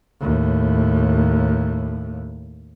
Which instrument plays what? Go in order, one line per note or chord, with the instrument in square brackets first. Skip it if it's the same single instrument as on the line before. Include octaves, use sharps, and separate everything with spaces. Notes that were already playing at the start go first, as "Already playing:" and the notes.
[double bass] D#2 A2